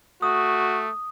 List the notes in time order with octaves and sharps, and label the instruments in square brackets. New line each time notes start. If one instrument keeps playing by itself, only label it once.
[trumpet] A3 [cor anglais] F#4 [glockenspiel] D#6